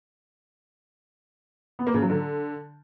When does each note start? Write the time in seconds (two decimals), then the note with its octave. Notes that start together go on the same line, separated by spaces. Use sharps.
1.79 B3
1.87 A#3
1.94 C#3
2.02 F#3
2.10 D3